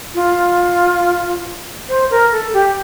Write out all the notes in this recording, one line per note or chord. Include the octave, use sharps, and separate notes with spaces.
F4
C5
A#4
A4
G4